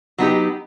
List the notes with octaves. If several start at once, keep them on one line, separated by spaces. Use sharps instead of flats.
F#3 B3 D#4 G4